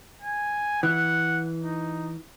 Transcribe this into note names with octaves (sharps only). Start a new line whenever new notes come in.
G#5
E3 F#5
D#4